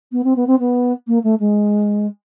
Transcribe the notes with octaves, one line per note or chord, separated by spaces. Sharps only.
B3
C4
B3
C4
B3
A#3
A3
G#3